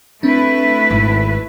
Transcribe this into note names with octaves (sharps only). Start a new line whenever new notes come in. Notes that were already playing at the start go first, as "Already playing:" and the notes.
A3 C4 D4 E4 B4
G#1